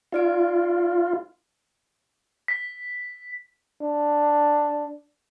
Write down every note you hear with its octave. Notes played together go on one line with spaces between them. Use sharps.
D#4 F4 D5 D7
B6
D4